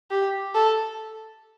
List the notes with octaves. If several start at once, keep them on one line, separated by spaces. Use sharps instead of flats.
G4
A4